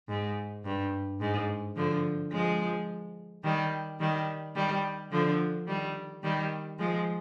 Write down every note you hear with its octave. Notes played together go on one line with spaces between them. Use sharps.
G#2
G2
G#2
D3 F3
F3 G#3
D#3 G3
D#3 G3
D#3 G3
D3 F3
D#3 G3
D#3 G3
F3 G#3